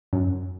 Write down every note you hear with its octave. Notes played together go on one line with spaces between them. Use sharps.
F#2